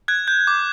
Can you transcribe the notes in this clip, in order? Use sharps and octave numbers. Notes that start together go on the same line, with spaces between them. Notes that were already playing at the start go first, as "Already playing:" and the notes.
F#6 G#6
G6
D6